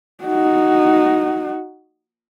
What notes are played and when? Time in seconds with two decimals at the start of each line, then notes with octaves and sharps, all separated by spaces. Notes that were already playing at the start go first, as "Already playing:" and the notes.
0.24 D#4 F#4